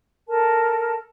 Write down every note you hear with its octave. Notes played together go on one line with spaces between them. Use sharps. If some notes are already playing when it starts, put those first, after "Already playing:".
A4 A#4 A5